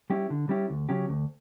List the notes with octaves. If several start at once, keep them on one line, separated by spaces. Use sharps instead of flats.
G3 C#4 E4 G4
D3
G3 C#4 E4 G4
D2
C#3 F#3 C#4 G4
D2